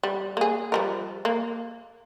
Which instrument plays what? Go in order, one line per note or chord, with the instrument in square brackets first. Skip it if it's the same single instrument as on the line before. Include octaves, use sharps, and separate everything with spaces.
[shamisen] G3
A#3 G#4
F3 G3 A#4
A#3